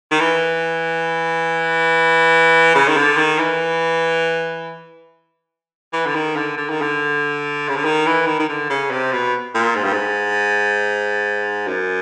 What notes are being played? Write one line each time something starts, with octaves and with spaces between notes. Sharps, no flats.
D#3
E3
C#3
D#3
D3
D#3
E3
E3
D3
D#3
D3
D3
D#3
D3
C#3
D3
D#3
E3
D#3
D#3
D3
C#3
C3
B2
A#2
G#2
G2
G#2
F#2